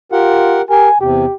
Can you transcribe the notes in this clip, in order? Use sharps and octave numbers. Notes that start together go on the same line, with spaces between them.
F4 G4 A#4 F#5
G4 A#4 G#5
E2 C3 G4